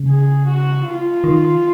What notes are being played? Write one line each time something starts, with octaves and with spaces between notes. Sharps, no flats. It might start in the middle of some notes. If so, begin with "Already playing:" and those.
Already playing: C#3
G#4
F#4
F4
D#3